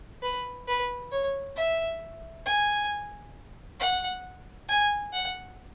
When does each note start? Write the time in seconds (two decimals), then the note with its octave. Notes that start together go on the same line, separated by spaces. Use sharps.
0.23 B4
0.68 B4
1.12 C#5
1.56 E5
2.46 G#5
3.80 F#5
4.69 G#5
5.13 F#5